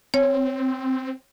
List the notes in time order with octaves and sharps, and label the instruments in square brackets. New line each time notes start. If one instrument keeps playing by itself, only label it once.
[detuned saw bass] C4 [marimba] C#5